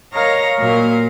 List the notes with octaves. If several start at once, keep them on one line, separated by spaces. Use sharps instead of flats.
A#4 C#5 D#5 F5 A#5 A#6
A#2 F#3 A#4 F5